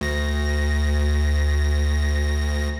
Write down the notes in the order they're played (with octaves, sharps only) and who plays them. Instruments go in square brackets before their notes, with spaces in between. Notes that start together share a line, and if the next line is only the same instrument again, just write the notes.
[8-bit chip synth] D2 A#6